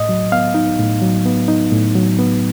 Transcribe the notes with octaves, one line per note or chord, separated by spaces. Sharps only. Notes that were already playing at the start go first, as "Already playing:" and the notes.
Already playing: A2 D#5
F#3
B3 F5
D#4
A2
F#3
B3
D#4
A2
F#3
B3